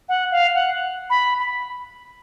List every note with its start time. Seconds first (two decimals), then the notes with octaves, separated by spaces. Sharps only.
0.09 F#5
0.32 F5
0.54 F#5
1.10 B5
1.39 B5